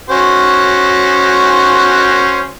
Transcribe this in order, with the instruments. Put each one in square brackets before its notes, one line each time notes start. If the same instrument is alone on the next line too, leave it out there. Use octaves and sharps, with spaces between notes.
[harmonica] C#4 F#4 C5